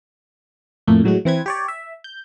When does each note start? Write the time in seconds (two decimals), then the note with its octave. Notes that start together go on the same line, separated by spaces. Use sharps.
0.87 F2 A2 A3 A#3
1.04 A2 F#3 G#3 F#4
1.25 E3 C4 B4 G#6
1.46 G4 C#5 D5
1.68 E5
2.04 G6